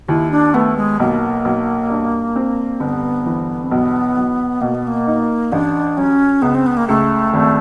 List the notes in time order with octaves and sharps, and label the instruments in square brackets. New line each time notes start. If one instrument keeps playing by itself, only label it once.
[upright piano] D#2 [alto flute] E4
[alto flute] D4
[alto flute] A3 [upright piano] B3
[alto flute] G#3
[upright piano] B1 [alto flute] A#3
[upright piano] B1
G2
C4
[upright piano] G1 [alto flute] B3
[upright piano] E3
[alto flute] C4
[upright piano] B1 [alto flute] B3
[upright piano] B1
[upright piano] B2 [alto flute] A#3
[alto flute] B3
A#3
[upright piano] D#4
[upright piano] A1 [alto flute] D4
[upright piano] F#3 [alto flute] C#4
[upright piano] C#2 [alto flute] B3
[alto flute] C4
B3
A#3
[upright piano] C#2 [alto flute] A3
[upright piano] G#1